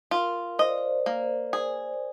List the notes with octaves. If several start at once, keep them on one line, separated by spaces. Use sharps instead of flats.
F4 A#4
C5 D#5
D5
C5
A#3
G#4